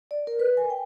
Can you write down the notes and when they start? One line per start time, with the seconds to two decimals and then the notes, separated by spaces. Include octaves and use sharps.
0.11 D5
0.27 A#4
0.39 B4
0.57 G#5
0.70 G5